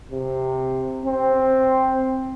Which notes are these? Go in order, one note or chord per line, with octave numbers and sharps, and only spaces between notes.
C3
C4